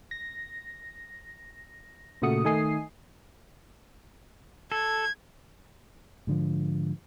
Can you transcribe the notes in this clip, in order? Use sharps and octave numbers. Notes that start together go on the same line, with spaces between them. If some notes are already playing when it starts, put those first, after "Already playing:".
A#6
A#2 C#3 A3 F#4 D#6 C#7
D#3 A3 D#4 G#5 D#6 C7
A4 G#6
G#2 D3 F3